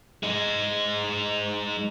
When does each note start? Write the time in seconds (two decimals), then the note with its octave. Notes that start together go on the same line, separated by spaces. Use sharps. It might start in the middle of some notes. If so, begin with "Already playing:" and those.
0.23 G#3 D#4